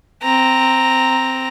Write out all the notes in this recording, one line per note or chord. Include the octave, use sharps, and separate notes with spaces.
C4 A#5